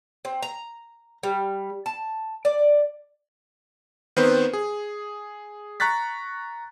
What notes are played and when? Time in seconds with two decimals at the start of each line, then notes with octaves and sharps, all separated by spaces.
0.25 C4
0.42 A#5
1.23 G3
1.86 A5
2.45 D5
4.17 D#3 B3 C4 B4 C5
4.53 G#4
5.80 A#5 C#6 F#6 A6 B6